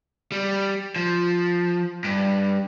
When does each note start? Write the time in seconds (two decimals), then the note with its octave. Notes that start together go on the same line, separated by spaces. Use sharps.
0.32 G3
0.96 F3
2.04 G2